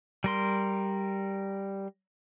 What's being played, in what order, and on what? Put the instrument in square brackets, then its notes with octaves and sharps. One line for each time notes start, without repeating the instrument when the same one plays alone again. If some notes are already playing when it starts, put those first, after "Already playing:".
[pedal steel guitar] G3 A#4 C6